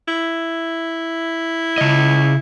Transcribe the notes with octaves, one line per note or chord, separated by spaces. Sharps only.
E4
C#3 D#5